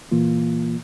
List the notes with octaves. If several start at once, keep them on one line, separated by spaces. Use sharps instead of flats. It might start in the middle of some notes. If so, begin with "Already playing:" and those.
A#2 E3 A#3 F4